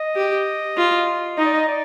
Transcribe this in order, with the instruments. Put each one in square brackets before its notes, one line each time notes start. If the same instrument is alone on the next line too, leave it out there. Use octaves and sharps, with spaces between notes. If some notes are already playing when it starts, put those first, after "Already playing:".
Already playing: [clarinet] D#5
[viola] G4
F4
[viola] D#4 [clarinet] D#5
[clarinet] D5
D#5
D5